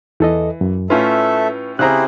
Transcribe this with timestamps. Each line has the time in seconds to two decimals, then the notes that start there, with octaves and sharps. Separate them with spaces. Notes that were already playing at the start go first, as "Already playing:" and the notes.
0.20 E2 E3 A4 D#5
0.61 F#2
0.90 A2 A3 C#4 F4 A4 B4 E5
1.79 C#3 C4 E4 G4 G#4 C5 A#5 F#6